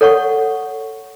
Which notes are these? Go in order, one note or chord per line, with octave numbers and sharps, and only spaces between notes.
A4 C#5 F#5 C#6